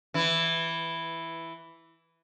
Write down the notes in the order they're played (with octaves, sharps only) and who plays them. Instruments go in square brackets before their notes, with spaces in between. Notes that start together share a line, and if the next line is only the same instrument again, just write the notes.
[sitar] E3 E4